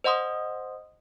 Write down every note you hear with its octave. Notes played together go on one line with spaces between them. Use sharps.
C5 D#5 F#5 C6 D#6